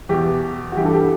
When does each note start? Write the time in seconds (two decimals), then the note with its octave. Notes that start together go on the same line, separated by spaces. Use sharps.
0.09 E2 B2 G4
0.72 F#4
0.77 E3 G4
0.81 G2 A4
0.93 G4